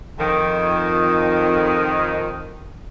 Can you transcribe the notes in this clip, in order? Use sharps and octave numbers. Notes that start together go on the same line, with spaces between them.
F2 D#3